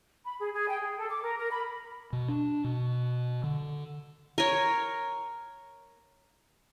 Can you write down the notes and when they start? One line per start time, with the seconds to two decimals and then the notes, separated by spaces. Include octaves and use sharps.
0.25 B5
0.39 G#4
0.54 G#4
0.69 G5
0.81 G#4
0.98 A4
1.10 D6
1.23 A#4
1.39 A#4
1.51 B5
2.13 B2
2.28 D4
2.64 B2
3.44 D3
4.38 A#4 C#5